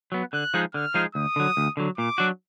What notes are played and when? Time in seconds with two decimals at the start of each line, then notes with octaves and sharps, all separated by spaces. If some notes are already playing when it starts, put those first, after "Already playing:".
0.12 F#3 B3
0.33 D3 F#6
0.54 F3 G#3 D#4 G#4
0.74 D3 F6
0.94 F3 G#3 D#4 G#4
1.15 D2 D#6
1.36 D3 F#3
1.57 D2
1.77 D3 F#3
1.98 A#2 D6
2.18 F#3 D4 F#4